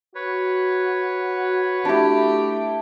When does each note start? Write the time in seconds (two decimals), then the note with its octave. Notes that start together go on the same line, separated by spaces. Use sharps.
0.15 F#4 B4 C#5
1.85 A3 D4 E4 G4